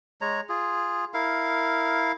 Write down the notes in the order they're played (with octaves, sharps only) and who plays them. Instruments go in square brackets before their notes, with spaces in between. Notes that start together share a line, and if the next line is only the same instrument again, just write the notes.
[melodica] G#3 C#5 A#5
F4 G#4
E4 A#4 F5